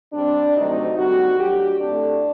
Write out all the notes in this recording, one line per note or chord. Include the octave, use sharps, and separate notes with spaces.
C3 G3 C4 D4
D2 C3 F#3 A3 C4 D#4
D#2 D3 G3 C4 F#4
D2 D3 F#3 G4
A2 A3 C4 D4